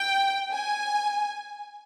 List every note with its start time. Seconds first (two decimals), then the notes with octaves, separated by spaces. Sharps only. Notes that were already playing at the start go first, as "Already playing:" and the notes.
Already playing: G5
0.52 G#5